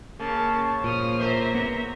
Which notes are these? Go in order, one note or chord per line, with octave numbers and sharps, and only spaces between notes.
C#3 A#3 A5
A#2 F3 D#6 F6
A#3 C5 E5 A#5
B3